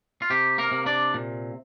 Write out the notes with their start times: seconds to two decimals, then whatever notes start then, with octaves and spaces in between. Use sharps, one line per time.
0.22 F4
0.30 C3 G4
0.58 A#3 A#4
0.72 C3
0.86 D4 D5
1.14 A#2